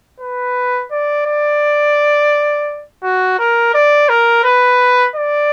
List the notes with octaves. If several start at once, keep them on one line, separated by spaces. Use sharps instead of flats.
B4
D5
D5
F#4
A#4
D5
A#4
B4
D5